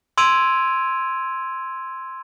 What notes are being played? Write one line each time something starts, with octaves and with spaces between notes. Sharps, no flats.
C6 E6 G#6 D7 D#7 F7